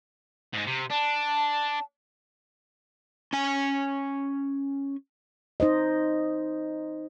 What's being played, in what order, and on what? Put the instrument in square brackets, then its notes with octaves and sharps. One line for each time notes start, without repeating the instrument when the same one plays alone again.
[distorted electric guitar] G#2 G#3
C3
[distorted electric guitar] D4 [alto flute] A5
[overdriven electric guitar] C#4 G#5
[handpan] D#4 C5 D#5